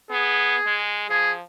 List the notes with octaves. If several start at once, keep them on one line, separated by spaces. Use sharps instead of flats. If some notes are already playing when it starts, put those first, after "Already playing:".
B3 G#4
G#3
F3 G#4